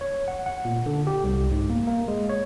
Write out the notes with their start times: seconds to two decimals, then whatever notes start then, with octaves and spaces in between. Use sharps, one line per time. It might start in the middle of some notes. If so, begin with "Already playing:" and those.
0.01 C#5
0.28 F#5
0.46 F#5
0.65 A#2
0.86 D3
1.07 G4
1.24 C2
1.51 G#2
1.70 A#3
1.87 A#3
2.08 G#3
2.29 C#5